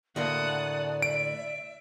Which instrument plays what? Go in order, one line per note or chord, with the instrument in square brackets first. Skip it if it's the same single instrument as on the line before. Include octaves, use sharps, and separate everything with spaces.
[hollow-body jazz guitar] D2 A2 A#3 [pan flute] D5 [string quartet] F#5 A5 D#6
[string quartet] E5 [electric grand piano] D7